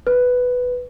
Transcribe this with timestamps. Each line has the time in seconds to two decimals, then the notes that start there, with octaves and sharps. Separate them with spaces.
0.07 B4